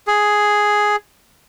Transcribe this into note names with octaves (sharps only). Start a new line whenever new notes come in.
G#4